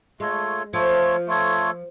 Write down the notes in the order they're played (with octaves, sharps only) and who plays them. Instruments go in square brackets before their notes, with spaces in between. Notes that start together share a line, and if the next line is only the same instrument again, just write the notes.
[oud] G#3 [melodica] A3 F4 A4 C#5
[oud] F3 [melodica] A3 F4 A4 C#5
[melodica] A3 F4 A4 C#5